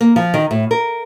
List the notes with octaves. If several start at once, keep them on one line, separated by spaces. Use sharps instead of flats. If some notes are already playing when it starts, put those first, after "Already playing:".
A#3
F3
D#3
A2
A#4